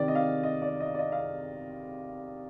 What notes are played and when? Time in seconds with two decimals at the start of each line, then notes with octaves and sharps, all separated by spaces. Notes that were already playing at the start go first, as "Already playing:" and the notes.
Already playing: C3 D#3 D5
0.08 D#5
0.15 F5
0.43 D#5
0.62 D5
0.80 D#5
0.94 D5
0.99 D#5
1.12 F5